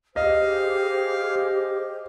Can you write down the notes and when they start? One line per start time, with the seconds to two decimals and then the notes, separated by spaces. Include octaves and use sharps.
0.16 G4 G#4 C5 D#5 F5